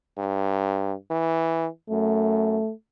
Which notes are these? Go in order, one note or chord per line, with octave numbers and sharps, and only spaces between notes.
G2
E3
F#2 A3